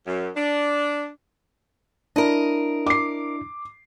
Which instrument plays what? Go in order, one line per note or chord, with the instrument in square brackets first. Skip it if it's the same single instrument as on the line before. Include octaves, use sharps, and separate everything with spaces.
[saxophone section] F#2
D4
[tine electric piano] D4 E4 [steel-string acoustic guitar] A#4 D#5
[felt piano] D6 C7